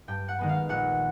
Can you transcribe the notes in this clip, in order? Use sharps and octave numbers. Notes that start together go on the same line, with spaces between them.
G2 G5
F#5
D#3 G#3 B3
F5
A#1 F#5